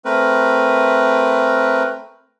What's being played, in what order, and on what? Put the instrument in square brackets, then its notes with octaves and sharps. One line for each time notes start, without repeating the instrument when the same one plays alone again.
[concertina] A3 C4 A#4 B4